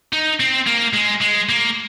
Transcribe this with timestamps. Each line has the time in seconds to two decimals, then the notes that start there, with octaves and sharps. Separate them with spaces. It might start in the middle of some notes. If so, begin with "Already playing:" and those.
0.13 D#4
0.40 C4
0.67 A#3
0.94 G#3
1.21 G#3
1.49 A#3